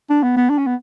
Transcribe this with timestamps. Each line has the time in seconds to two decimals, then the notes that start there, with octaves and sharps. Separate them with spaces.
0.10 D4
0.23 B3
0.37 B3
0.50 D4
0.58 C#4
0.67 B3